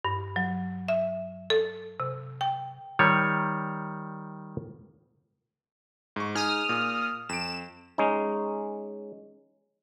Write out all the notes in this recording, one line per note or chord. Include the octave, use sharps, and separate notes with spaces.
G2
F#3
E5
A4
C3
G5
D#3 G3 C#5
G#2 C#6
D#4 G#4 G#5 D#6 F6
A#2
F2 D7 E7
G#3 C#4 D#4